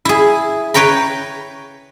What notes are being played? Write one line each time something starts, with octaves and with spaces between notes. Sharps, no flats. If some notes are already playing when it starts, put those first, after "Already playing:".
E4 G#4
B4 C#5 G5 A#5 B5